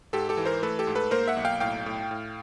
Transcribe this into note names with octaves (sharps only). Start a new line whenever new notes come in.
G#2 G4 A4
G4 A4
E3
A#4 C5
A3 A4 B4
G4 A4
G#2
A4 B4
A#3 A#4 C5
E5 F#5
B1
F5 G5
A2 F5 G5
A2
A2